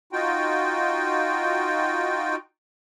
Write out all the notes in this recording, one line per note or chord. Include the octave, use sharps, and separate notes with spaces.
D#4 F4 F#4 G5